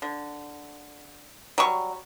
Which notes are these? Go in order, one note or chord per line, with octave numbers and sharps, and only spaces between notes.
D3
F#3 G3 C#6